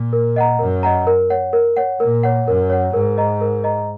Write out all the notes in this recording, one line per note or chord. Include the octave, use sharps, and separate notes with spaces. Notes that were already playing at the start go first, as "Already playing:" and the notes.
Already playing: A#2
A#4
D#5 F#5 A#5
F#2 A#4
D#5 F#5 A#5
A#4
C#5 F#5
A#4
C#5 F#5
A#2 A#4
C#5 F#5
F#2 A#4
C#5 F#5
G#2 A#4
D#5 A#5
A#4
D#5 A#5